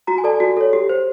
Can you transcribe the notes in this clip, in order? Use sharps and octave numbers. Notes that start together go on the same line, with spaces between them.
F#4 A#5
G#5
A4 D5 A5
F#4
A4 C#5
G4
C5